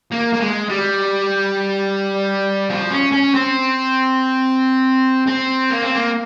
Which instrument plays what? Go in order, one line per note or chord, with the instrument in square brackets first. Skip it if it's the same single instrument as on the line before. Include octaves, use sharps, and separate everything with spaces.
[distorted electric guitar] A#3
A#3
G#3
G3
F3
C#4
C#4
C4
C4
A#3
C4
A#3